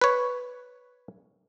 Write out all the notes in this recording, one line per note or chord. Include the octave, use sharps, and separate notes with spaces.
B4 C#5